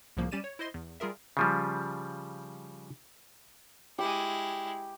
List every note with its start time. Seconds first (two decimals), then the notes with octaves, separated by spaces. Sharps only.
0.17 C2 A2 C#3 F3 A#3
0.32 G3 C#4 G4 D5 D#7 E7
0.44 C#5
0.59 E4 C5 D#5 C6
0.74 E2
1.00 G3 F4 G#4 A#4 E5
1.37 C#3 F3 G3
3.99 G#3 E4 G4